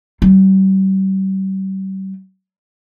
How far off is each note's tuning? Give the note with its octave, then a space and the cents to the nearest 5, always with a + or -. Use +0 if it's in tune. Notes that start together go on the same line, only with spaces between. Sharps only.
G3 -40 F4 -25